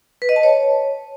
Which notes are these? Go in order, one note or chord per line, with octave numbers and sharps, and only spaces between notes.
B4
D#5
A5
C#5